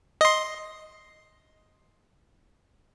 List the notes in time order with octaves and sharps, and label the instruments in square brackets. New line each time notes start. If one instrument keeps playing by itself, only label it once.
[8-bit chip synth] D#5 C6